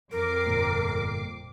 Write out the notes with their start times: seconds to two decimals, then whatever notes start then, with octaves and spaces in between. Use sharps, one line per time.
0.12 F2 A#4 D6 C7
0.47 G1 A#2